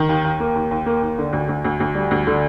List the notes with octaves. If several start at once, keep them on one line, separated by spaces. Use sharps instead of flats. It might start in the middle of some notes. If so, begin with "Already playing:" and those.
Already playing: D#3
D#2
D#2
A#3
D#2
D#2
A#3
D#2
D3
D2
D2
D2
D2
G3
D2
D3